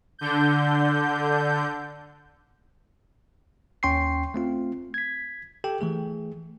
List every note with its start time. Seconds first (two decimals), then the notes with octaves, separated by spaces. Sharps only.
0.19 D3 G6
3.83 D#2 C#4 G5 C6 C#6 C7
4.34 A3 C4 F4
4.94 G#6 B6
5.64 G4 A4 G5
5.81 E3 A3 G#4